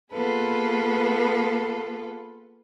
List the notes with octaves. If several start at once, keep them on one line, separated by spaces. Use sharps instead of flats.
A#3 B3 F4 G#4 A4 B4